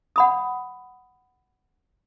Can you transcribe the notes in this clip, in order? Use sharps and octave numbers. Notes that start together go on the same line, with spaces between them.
F#5 B5 D#6